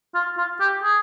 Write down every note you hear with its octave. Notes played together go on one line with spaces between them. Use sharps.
F4
F4
G4
G#4